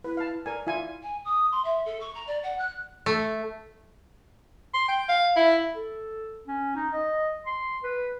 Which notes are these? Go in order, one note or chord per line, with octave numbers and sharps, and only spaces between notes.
E4 B4
F5 A5
A#4 D5 G#5
E4 F4 G#5
G#5
D#6
C6
E5
A4
C#6
A#5
D5
F#5
F#6
A3
C6
G5
F5
E4
A4
C#4
D#4
D#5
C6
B4